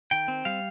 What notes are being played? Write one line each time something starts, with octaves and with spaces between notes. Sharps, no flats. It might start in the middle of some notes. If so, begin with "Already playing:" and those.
D#3 G5
C4
G3 F5